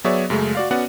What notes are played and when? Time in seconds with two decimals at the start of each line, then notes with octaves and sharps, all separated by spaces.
0.04 F#3 B3 G#4 C#5 D5 E5
0.30 F#2 C#3 G#3 A3
0.55 F#4 D5 F5
0.71 B3 C#4 F#4 D5 F#5